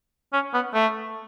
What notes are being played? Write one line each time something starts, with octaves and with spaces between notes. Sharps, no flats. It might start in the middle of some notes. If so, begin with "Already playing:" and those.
C#4
B3
A3